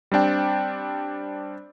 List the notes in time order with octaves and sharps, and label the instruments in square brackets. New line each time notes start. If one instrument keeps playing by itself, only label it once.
[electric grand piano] G3 C4 D4 G5